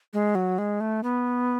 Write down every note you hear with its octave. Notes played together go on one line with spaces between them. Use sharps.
G#3
F#3
G#3
A3
B3